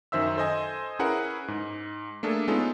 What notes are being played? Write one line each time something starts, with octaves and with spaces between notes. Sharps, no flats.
F#2 D#3 C5 E5 E6
A4 C5 D#5 G#5
C#4 E4 G#4 A#4 B4 F#5
G#2
A3 A#3 D4 G#4 A4
G#3 B3 C#4 D#4 F4 A4